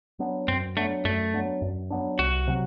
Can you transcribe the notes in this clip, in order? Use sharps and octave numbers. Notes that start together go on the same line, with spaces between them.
F#3 B3 D4
F#2 C4
F#3 A3 B3 D4
F#2 A3
F#3 B3 D4
F#2
F#3 B3 D4
C2 F#4
C3 F#3